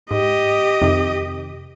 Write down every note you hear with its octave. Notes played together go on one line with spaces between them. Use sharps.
G#2 G4 D#5
F2 C3 D#3